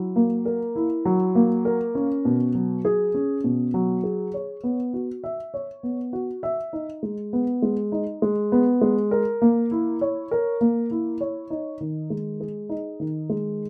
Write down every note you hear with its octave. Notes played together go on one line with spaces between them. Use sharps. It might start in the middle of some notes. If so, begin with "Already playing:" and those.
Already playing: F#3 E4
A#3
A#4
E4
F#3
A#3
A#4
C#4
B2
F#3
G#4
C#4
B2
F#3
G#4
C#5
B3
F#4
E5
C#5
B3
F#4
E5
D#4
G#3
B3
G#3
D#4
G#3
B3
G#3
A#4
A#3
E4
C#5
A#4
A#3
E4
C#5
D#4
D#3
G#3
G#4
D#4
D#3
G#3